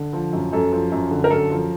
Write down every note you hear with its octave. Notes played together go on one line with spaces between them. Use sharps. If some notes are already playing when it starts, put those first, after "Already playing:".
Already playing: D3
F3
F#2
F#2 A4
F3
F#2
D3
A#4
F#2 A4
F3